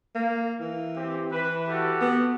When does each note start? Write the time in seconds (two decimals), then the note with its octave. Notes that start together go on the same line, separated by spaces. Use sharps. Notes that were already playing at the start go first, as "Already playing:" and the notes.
0.15 A#3
0.60 E3
0.96 C4 G4
1.31 E3 B4
1.68 F#4 G4 A4
2.01 B3